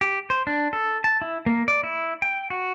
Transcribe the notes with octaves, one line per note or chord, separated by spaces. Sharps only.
G4
C5
D4
A4
A5
E4
A#3
D5
E4
G5
F#4